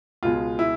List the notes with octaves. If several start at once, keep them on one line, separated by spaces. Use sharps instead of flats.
C#2 B2 G#3 F4
E4